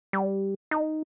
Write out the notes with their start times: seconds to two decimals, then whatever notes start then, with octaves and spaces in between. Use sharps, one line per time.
0.13 G3
0.71 D#4